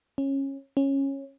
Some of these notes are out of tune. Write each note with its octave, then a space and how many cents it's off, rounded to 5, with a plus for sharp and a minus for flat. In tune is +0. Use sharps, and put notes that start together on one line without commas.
C#4 -20
C#4 -15